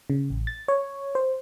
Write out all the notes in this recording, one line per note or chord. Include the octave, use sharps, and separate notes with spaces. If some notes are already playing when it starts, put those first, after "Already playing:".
C#3
A1
A6
C#5
C5